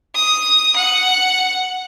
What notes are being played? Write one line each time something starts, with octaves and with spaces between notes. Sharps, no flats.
D#6
F#5